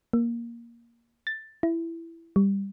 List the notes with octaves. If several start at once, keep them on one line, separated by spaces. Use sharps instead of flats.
A#3
A6
E4
G3